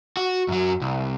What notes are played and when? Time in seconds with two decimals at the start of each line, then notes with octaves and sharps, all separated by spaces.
0.17 F#4
0.48 F#2 F#3
0.81 C2